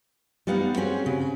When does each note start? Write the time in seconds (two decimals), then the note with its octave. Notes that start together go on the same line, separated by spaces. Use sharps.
0.47 G3 B3 D#4 F5 F#5
0.76 G3 C4 C#4 F#4 G#4
1.06 C#3